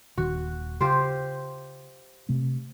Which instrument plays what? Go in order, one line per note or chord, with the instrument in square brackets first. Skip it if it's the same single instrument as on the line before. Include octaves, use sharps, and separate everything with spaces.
[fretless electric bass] D#1 D#3 D4 [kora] F#4
[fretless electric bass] C#3 [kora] F4 G4 C5
[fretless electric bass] C3 A3 C4